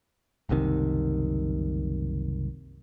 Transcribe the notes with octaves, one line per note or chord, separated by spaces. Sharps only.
F#1 C2 C3 D#3